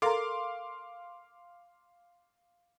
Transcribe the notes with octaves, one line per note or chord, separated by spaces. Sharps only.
A4 A#4 F5 A#5 C6 D6